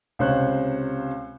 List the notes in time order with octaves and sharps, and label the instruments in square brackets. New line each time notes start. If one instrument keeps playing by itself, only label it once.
[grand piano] C#2 C3 C5 C#5 C6 F#6